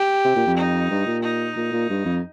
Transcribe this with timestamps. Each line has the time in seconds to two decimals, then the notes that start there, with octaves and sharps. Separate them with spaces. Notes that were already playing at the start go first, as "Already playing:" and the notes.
Already playing: G4
0.25 C3
0.36 A#2
0.47 F2
0.57 D#4
0.91 G2
1.07 A#2
1.23 D#4
1.57 A#2
1.72 A#2
1.89 G2
2.06 F2